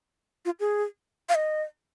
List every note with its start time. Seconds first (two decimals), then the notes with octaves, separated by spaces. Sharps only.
0.45 F4
0.60 G#4
1.29 F5
1.35 D#5